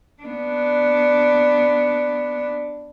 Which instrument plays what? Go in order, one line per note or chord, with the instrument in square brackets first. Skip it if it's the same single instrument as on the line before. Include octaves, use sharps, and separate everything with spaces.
[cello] B3 D4